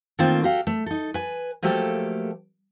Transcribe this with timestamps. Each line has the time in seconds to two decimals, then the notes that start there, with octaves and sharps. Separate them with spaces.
0.19 D#3 A3 A#3 C4 F4 C5
0.44 F#4 G4 A4 F5
0.67 A3
0.86 D#4 A4
1.14 B4 G#5
1.63 F3 F#3 A3 A#3 G4 A4